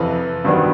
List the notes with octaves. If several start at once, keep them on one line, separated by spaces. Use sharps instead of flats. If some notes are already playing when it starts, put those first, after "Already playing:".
Already playing: F2 C3 E3
G2 D#3 F#3 B3 D4